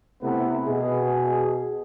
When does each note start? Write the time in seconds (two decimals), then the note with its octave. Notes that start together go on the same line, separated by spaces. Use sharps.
0.22 C3 A3 B3 E4 B4
0.66 B2 G#4